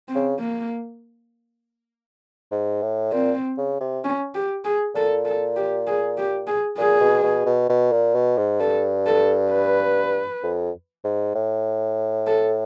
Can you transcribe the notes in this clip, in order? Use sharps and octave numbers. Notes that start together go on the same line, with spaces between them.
C4
C#3
A#3
G#2
A2
A#2 C4
C#3
C3
C#4
G4
G#4
A#2 A4
A4
G4
G#4
G4
G#4
A#2 G#4
B2
B2
B2
B2
A#2
B2
G#2
G2 A4
A4
B4
F2
G#2
A2
A4